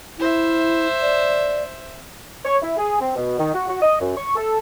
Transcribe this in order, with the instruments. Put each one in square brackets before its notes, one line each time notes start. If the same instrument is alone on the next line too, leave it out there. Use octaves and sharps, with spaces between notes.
[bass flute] E4 [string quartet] C5 E5
[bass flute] D5
[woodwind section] C#5
E4
G#4
C4
B2
D#3
F#4
F#4
D#5
F#2
C#6
A4